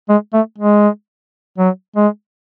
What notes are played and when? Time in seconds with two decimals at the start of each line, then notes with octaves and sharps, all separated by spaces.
0.09 G#3
0.33 A3
0.58 G#3
1.58 F#3
1.96 G#3